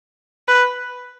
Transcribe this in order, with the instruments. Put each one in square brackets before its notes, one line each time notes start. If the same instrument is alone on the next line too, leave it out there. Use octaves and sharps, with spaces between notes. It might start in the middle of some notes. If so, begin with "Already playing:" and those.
[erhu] B4